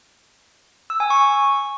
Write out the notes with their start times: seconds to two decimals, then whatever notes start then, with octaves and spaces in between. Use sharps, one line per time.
0.90 E6
1.00 G#5
1.10 C#6